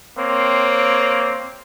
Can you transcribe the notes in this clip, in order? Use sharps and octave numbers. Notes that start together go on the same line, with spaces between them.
A#3 C4 C#5